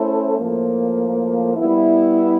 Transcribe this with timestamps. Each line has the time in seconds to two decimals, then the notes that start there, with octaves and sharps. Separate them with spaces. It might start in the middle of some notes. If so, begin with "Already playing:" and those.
Already playing: A3 C#4 E4 A4 C5
0.38 A2 F3 A#3
1.57 G3 B3 E4